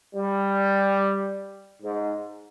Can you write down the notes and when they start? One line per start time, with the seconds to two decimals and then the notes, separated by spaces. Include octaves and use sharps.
0.14 G3
1.82 G#2